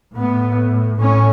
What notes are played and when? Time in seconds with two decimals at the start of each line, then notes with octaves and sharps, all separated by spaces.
0.15 A2 B3
1.00 A2 C#4